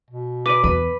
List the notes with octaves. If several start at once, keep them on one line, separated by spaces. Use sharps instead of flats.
B2
B4 D5 D6 D#7
E2 B4